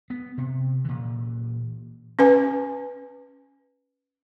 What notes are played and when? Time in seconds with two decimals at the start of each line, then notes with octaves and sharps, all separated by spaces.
0.10 B3
0.38 C3
0.85 A#2 E3
2.19 C#4 B4 G#5